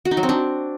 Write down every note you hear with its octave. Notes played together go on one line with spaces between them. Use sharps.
F#4
D#4
F#3
C4
D4